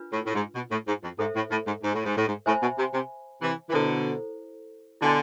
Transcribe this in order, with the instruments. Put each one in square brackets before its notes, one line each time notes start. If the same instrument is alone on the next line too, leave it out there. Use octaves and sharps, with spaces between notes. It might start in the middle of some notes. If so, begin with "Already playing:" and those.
Already playing: [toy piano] D4 F4 B4
[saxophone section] A2
A2
G#2
B2
A2
G#2
F2
[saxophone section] G#2 [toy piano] A4 C5 E5
[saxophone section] A2
A2
G#2
G#2
A2
G#2
A2
G#2
[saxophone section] A2 [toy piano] C5 E5 G#5 B5
[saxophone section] B2
C3
C3
C3 E3
E3
[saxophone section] B2 D3 [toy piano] E4 A4 C5
[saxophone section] B2 D3 [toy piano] E4 B4 D5 G#5 C6